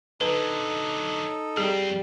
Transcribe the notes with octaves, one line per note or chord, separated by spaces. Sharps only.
D3 F#3 D#4 A4 B4
F2 G3 C4 G#4